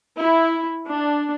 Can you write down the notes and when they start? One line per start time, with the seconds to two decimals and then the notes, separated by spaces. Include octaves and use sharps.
0.19 E4
0.88 D4